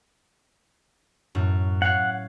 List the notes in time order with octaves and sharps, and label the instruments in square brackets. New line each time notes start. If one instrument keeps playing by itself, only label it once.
[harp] F#2 A2
[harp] C#5 F5 [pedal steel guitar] F#5